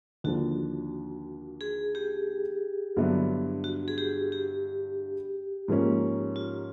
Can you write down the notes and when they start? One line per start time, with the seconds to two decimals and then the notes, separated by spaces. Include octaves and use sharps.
0.24 D#2 D3 F3 F#4
1.61 G#4
1.95 G4
2.97 G2 D3 F#3 B3 E4
3.64 F#4
3.88 G#4
3.98 G4
4.32 G4
5.68 G#2 F3 A#3 C#4
6.36 F4